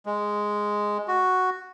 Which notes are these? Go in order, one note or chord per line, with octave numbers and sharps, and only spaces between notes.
G#3
F#4